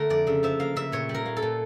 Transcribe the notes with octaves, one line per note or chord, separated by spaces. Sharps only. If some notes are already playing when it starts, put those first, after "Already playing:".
Already playing: D3 A3 A#4
F2 D5
C#3 E5
F3 E5
A#3 F5
C#3 E5
A#2 C#5
G3
A#4
A#3
A4
A#2